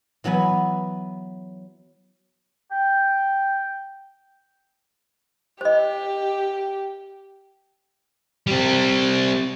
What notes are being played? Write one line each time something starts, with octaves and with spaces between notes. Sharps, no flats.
E3 F#3 B3 B4 G#5
G5
G4 C5 D#5
G3 C4